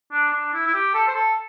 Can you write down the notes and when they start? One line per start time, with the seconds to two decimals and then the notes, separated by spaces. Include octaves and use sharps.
0.12 D4
0.33 D4
0.54 E4
0.67 E4
0.74 G4
0.94 A4
1.08 C5
1.15 A4